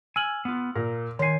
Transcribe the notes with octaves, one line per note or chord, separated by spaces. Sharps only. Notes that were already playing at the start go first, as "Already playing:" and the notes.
G#5 E6 F6 F#7
B3 F4
A#2 A#4
D#3 C#5 G#5 C6 C7